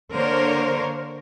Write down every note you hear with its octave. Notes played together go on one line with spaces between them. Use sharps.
D3 A#3 A#4 C5 C#5